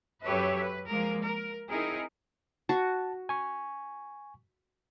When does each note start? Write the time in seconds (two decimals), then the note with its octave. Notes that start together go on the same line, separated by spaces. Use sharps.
0.23 F#2 G4 A4 B4 C#5 E5
0.60 B4
0.90 F3 G#3 A#3 A#4
1.26 A#4
1.69 C4 D#4 E4 G#4 A#4
2.69 F#4 A5
3.29 G#5 C#6